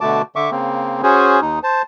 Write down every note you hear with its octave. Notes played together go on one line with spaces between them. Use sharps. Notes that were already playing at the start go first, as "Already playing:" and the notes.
B2 D3 A3 F#4 A5 D6
D3 E5 C#6 D6
C#3 A#3 C4
C#4 F#4 G#4 C5
D#2 D#4
C5 A5